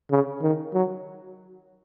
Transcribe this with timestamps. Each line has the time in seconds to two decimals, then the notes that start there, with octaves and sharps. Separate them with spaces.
0.11 C#3
0.42 D#3
0.74 F#3